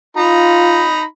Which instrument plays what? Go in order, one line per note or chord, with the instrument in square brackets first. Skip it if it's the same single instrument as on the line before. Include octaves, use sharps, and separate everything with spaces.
[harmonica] D#4 A#5 B5 [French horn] F4